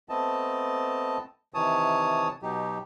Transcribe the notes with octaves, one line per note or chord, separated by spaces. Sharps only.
A3 B3 C4 D#5 A5
C3 D#3 E3 C#5 A5 D#6
B2 F#3 D#4 G4